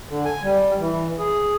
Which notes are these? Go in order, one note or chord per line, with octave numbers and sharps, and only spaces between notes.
D3
G#5
G3
E3
G#4